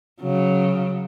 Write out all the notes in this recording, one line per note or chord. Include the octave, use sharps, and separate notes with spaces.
C#3 F#3